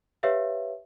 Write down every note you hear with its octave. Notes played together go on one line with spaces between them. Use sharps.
G4 B4 C#5 E5 F5